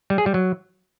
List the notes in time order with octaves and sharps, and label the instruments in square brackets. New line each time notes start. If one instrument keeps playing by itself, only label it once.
[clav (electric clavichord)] G3
G#4
G3
F#3